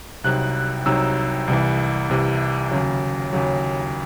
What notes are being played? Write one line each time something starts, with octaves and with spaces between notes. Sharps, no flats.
C2 C3 F#3 C4 D#4 F#6
C2 C3 F#3 C4 D#4 E6
C2 C3 E3
C2 C3 E3
D#2 C#3 F#3
D#2 C#3 F#3